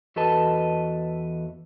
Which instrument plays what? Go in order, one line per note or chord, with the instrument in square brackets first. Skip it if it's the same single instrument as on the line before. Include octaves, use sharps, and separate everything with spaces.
[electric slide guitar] E2 F#4 A4 B4 D#5 A5